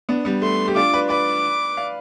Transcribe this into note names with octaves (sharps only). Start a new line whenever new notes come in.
B3 D4
G3 B3
A3 C6
G4
D4 F4 D6
B4 D5
B4 D5 D6
D5 F5